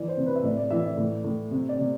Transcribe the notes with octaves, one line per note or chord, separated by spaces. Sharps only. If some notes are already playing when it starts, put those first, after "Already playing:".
Already playing: E3 D5
C5
C3
B4
E5
A2 D5
D5
E3 E5
D5
A2
A2
C3
D5
C3